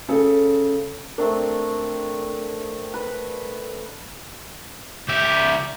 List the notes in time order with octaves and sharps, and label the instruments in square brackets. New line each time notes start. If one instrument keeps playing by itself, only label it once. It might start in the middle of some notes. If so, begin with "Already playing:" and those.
[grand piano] C#3 A4
[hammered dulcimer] A3 C4 D4 [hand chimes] A#4
[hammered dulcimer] B4
[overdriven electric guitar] C#2 E5 [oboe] G4